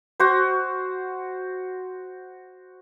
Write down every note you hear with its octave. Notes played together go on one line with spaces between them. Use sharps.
F#4 C5